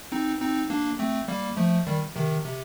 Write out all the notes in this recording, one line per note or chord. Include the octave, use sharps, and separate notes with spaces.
C4 D#4
C4 D#4
A#3 D4
A3 C4
G3 A#3
F3 A3
D#3 G3
C3 D#3
C3